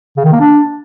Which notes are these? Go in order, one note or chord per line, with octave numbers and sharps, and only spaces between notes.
C#3
D#3
A#3
D4